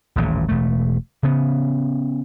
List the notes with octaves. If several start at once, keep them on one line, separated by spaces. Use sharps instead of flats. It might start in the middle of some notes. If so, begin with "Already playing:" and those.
D#1 A1 A#2
E1 A3
C#3 B3